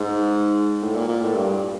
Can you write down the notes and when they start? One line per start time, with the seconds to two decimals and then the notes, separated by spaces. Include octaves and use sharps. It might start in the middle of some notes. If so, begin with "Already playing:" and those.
Already playing: G#2
0.82 A2
0.95 A#2
1.08 A#2
1.22 A2
1.35 G2